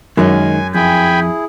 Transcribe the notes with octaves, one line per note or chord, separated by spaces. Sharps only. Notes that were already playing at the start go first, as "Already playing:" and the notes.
F#2 D#3 G#3 G#5
F2 E4 G#4 G5 G#5 B5